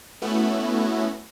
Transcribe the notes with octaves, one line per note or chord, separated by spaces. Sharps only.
A3 B3 C#4 E4 F#4